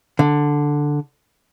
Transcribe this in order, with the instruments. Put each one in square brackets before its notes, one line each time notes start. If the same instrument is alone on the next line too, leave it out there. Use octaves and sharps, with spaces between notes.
[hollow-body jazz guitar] D3